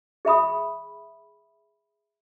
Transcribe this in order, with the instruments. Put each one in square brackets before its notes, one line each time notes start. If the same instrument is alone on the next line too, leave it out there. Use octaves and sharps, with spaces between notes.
[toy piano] G#4 E5 B5 D#6